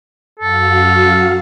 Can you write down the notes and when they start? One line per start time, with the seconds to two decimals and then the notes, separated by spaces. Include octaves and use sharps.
0.40 F#2 F#4 A4 F5